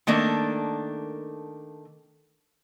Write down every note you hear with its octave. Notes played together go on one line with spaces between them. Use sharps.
D#3 A3 A#3 D4